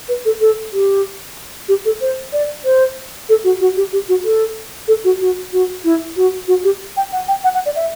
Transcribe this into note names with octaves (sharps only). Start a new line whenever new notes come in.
B4
A4
A4
G4
G4
A4
C5
D5
C5
A4
F#4
F#4
G4
G4
F#4
A4
A4
F#4
F#4
F#4
E4
F#4
F#4
G4
G5
F#5
G5
F#5
F#5
D5
E5